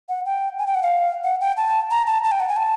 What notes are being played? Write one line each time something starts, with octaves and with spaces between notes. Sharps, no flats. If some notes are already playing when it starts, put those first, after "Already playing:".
F#5
G5
G#5
G5
F#5
F5
F#5
G5
A5
A#5
A5
A5
G5
F#5
G#5
A5